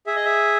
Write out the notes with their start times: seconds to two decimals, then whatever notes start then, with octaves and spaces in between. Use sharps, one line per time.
0.07 G#4 E5
0.16 D#5
0.25 E5